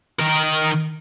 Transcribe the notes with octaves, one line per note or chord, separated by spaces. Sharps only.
D#3 A#4